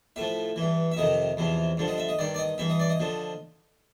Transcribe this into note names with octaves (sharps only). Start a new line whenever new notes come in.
A2 F3 E5
E3
G2
E5
F2 C3 D#3 D#5
E2 C3 F3
G2 D3 F3
D#5
E5
D#5
G2 D#3 D5
D5
D#5
G2 E3 E5
D#5
D5
D#5
D3 F3